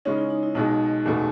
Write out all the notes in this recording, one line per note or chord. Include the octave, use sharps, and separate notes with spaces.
C#3 G#3 C#4 D#4
E4
D#4
E4
B1 B2 G#3 D#4
F#1 E2 B2 A3